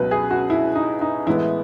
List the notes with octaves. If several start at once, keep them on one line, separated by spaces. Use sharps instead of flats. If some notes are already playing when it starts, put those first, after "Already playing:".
Already playing: C#2 B2 F#3 B4
G#4
F#4
E4
D#4
D#4
A1 A2 G#3 B3 E4